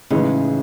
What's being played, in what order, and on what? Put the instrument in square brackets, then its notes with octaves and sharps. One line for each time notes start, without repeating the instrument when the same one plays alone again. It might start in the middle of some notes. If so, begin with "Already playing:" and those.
[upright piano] A2 E3 G#3 D#4 [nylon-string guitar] C#3